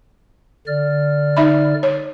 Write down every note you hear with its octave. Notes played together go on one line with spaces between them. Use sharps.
D3 D5 F6
D#4 E5 B5
C#5